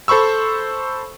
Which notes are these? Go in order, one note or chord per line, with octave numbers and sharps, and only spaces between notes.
A4 C5 B5 C#6 E6